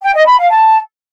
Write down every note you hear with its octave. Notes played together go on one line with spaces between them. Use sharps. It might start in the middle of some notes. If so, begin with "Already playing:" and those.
G5
D#5
B5
F5
A5